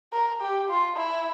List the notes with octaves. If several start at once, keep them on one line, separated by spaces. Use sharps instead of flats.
A#4
G4
F4
E4